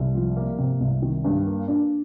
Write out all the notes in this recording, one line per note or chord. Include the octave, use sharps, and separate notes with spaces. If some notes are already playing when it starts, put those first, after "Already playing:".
Already playing: C2
F3
A#3
C3
C2
D#3
G2
A#3
D4